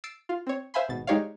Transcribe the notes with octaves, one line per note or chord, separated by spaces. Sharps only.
E6 A6 C7 D7
F4
C4 C#5
C5 E5 F5 G#5 B5 C6
G#1 B2 A6
G#3 D#4 G4 C#5 D5 F5